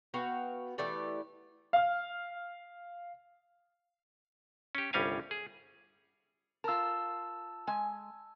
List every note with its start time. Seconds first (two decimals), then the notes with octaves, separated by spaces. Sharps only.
0.14 B3 F#4 F5 G5
0.78 E3 A3 G4 D5
1.73 F5 F6
4.75 C#4 G4
4.93 G1 C2 G3 C#4 F5 G#5
5.31 G#4
6.64 F4 A#4 A5 E6
7.67 G#3 G#5